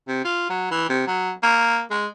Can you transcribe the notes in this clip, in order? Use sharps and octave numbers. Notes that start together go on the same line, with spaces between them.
C3
F4
F#3
E3
C3
F#3
A#3
G#3